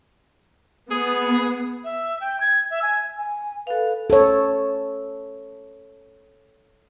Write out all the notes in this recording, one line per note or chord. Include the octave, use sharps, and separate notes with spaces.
B3 G#4
E5
G5
G#6
E5
G#5
G#5
A4 B4 F5
A4 C#5